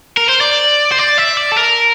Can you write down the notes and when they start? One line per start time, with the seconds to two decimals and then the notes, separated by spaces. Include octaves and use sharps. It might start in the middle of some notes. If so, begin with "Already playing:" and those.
0.17 A#4
0.29 C5
0.41 D5
0.92 C5
0.99 D5
1.18 E5
1.37 D5
1.52 A4
1.56 A#4